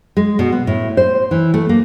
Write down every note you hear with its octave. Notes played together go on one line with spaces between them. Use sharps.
G#3
B2
B3
A2
C5
E3
A3
A#3